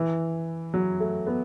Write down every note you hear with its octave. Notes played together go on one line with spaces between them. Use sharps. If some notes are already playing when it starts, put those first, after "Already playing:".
Already playing: E3
F#3
A3
B3